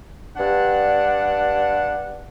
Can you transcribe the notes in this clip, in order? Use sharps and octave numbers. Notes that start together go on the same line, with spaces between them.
G2 D4 F#5